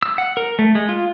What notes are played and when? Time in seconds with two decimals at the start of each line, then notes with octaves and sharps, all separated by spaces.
0.03 E6
0.18 F#5
0.37 A#4
0.59 A3
0.75 G#3
0.89 F4